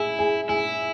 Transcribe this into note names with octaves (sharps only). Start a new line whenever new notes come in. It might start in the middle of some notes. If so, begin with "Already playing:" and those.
Already playing: E4 G#4
G#4
E4 G#4